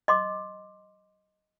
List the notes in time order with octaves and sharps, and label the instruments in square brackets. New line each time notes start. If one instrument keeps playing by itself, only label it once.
[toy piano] D#5 C6 D6